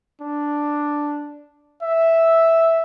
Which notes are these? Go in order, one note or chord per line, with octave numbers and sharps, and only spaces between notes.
D4
E5